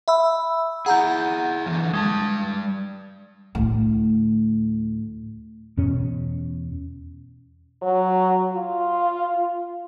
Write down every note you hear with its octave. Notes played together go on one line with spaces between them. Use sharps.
E5 B5 E6
E4 G#4 F#5 A#5 G6
D3 E3 F3
G3 G#3 G5 A5
D2 A2
E2 B2 C#4
F#3
F4